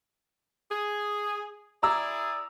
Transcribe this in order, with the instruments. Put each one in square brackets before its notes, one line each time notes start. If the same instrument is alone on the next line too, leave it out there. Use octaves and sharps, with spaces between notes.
[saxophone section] G#4
[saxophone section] E4 G#4 D5 [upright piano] A#5 D6 E6